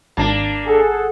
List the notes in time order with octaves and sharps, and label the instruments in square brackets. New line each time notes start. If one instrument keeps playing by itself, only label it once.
[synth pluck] G#1 A5 [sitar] A#3 D4
[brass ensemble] G#4 F#5 [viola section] A4